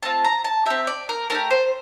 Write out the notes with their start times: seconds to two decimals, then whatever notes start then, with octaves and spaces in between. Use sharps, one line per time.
0.03 A3 C4 F4 A5
0.24 A#5
0.44 A5
0.66 C4 G4 E5
0.87 D5
1.09 A#4
1.30 A3 D4 G4 A#4
1.51 C5